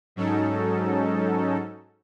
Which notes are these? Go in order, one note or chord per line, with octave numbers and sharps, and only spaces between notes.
G#2 F#3 C#4 D#4 A4